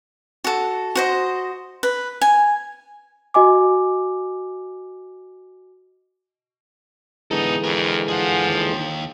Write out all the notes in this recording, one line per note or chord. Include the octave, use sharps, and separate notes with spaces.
F#4 A4
F#4 C5 D#5
B4
G#5
F#4 D#5 G#5 D6
D3 E3 G#3 B3 D#4 A4
F2 A#4 B4
F3 G#4 F#5
D#2